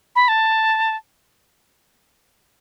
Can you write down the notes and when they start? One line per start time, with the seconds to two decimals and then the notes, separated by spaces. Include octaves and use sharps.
0.15 B5
0.28 A5